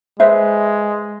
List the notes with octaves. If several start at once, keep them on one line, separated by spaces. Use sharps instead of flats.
G#3 B4 C5 E5